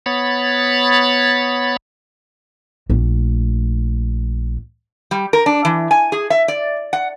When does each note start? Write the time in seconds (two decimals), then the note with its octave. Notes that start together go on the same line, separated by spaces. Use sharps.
0.06 B3 C#5 B5 A6
2.90 A#1 A3
5.11 G3
5.33 A#4
5.46 D4
5.65 E3
5.91 G#5
6.12 G#4
6.30 E5
6.48 D5
6.93 F#5